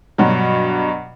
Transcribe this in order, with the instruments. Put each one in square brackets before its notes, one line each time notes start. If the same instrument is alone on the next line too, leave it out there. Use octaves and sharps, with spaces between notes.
[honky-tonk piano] G2 B2 F#3